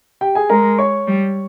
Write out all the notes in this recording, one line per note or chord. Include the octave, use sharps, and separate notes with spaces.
G4 G5
G#4 G#5
G#3 A#4 A#5
C#5 C#6
G3